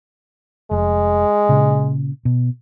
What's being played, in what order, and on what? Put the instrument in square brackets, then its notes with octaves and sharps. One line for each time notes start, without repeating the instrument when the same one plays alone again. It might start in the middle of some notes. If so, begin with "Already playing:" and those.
[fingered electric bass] F1 [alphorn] G#3
[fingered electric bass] A#2 C#3
B2